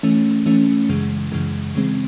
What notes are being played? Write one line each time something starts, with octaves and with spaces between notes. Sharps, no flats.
E3 A3 C#4
E3 A3 C#4
F#2 C#3 E3 G#3
F#2 C#3 E3 G#3
C#3 E3 G#3 C4